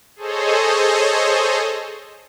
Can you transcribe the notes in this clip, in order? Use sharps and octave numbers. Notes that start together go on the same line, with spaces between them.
G#4 A4 C5 C#5 D#5